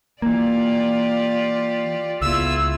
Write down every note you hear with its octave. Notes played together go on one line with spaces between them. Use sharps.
E3 A#3 F4 G4 D5
C#2 B3 E4 F4 E6